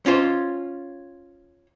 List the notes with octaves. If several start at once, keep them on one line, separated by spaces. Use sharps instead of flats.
C#4 F4 C5